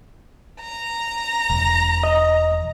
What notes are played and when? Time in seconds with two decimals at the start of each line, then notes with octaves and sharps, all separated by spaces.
0.61 A#5
1.50 E1
2.04 D#5